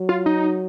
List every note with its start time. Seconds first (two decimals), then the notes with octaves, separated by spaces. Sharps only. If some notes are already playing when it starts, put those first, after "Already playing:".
Already playing: F#3
0.09 F4
0.26 D#4